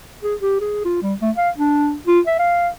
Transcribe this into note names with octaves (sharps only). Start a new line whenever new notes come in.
G#4
G4
G#4
F4
G3
A3
F5
D4
F4
E5
F5